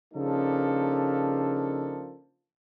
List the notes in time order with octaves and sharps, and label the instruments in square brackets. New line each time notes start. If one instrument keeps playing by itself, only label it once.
[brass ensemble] C#3 F3 A#3 D4 D#4 A4